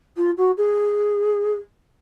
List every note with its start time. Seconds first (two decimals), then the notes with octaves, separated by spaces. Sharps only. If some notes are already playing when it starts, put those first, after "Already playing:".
0.16 F4
0.37 F#4
0.57 G#4